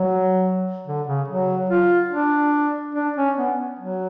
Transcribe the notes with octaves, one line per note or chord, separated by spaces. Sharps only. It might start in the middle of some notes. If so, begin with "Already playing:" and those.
Already playing: F#3
D3
C#3
F#3
F4
D4
D4
C#4
B3
F#3